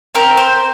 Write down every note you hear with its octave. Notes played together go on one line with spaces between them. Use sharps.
C4 G4 A#4
C5